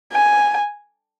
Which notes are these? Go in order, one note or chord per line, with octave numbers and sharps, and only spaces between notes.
G#5